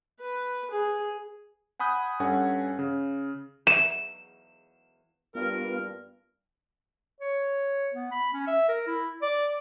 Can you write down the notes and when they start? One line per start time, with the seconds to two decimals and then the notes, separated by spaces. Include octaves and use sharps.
0.20 B4
0.70 G#4
1.79 F#5 G#5 B5 D#6 F#6 G6
2.20 G2 C#4 A4 F#5 G#5
2.79 C#3
3.67 E7
5.35 G2 B3 F4 A#4
7.20 C#5
7.94 B3
8.12 B5
8.33 C#4
8.47 E5
8.69 A#4
8.87 E4
9.22 D5